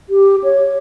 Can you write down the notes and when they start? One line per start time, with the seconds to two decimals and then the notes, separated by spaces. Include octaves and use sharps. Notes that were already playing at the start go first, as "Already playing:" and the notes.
0.10 G4
0.44 C#5